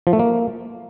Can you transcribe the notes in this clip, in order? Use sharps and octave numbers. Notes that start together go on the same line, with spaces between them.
F3
A3
A#3